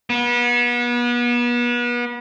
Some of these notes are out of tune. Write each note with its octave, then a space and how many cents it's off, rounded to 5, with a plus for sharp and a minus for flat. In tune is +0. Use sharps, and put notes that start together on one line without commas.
B3 -35